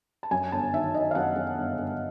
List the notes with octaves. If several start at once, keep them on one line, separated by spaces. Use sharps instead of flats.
A5
F#2 G#5
G1 A5
D#3 E5
D#3 D#5
F5
F#2 F#5
F#2
G1
G1